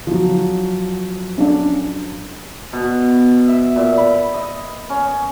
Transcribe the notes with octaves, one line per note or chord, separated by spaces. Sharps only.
F3 F#3
C#4 D4
B2
E5
A#2
B5
D#5
C#4